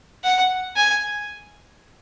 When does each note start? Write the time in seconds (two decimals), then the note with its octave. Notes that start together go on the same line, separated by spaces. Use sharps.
0.24 F#5
0.76 G#5